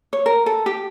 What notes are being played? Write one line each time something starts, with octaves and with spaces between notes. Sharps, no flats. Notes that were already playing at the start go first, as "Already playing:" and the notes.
C#5
A#4
A4
G4